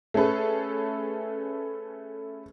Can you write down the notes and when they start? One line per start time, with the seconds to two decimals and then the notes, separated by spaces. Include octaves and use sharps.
0.14 A3 C#4 G#4 A4 B4